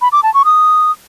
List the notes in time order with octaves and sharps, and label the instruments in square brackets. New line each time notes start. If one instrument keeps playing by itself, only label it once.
[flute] B5
D6
A5
C#6
D#6